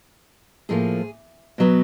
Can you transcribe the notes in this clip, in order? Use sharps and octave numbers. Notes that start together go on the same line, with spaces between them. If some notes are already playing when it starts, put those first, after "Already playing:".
A2 F3 A#3 G#4
B2 F#3 B3